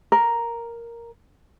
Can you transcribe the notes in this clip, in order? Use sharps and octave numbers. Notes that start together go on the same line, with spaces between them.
A#4